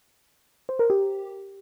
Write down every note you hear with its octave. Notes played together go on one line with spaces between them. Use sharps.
C5
A#4
G4